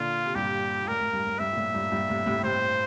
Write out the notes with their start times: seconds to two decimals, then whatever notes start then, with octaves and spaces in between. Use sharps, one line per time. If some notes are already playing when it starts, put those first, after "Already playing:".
Already playing: A#2 D3 F4
0.25 C3
0.35 G2 A#2 G4
0.83 A#2
0.88 A2 A#4
1.00 A2
1.13 G2
1.26 A2
1.39 G2 E5
1.52 A#2
1.57 A2
1.74 G2 A#2
1.92 G2 A#2
2.09 A2 C3
2.26 A2 C3
2.43 A2 C3 C5